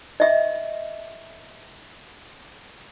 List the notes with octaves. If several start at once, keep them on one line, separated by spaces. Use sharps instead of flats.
D#5 E5